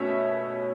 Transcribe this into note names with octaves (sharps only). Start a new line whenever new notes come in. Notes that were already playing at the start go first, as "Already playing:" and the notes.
Already playing: B2 A3 C#4 C#5 E5